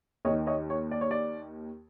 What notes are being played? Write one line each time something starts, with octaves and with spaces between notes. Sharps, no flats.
D#2 D#3 C#5 D#5
C#5 D#5
C#5
D5
C#5
D5